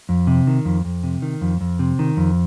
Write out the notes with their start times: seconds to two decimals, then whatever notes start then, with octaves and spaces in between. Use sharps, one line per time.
0.09 F2
0.27 C3
0.47 D#3
0.65 F2
0.85 F2
1.04 C3
1.22 D#3
1.41 F2
1.61 F2
1.79 C3
1.99 D#3
2.17 F2